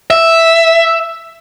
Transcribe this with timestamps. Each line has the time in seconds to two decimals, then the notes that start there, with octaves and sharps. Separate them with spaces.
0.10 E5